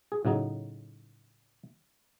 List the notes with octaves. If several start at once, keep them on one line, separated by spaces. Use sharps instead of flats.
G#4
A2 C#3 F#3 D#4